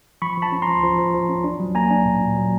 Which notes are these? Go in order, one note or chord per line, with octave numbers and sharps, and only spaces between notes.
F3 B5 C#6
F3
A5 B5
C#4
A#5 C6
F3
F3
F3
F3
C#4
D4
F#3
A#3 G#5 A#5
D4
A#2
A#2
F#3